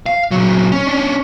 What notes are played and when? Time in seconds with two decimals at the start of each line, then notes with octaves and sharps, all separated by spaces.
0.06 F5
0.31 A#2 F#3
0.72 C#4
0.87 C#4 D4